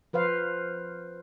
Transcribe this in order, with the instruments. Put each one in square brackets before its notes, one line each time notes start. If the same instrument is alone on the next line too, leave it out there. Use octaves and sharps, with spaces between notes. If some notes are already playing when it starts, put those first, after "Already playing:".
[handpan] F3 B4 C5 F5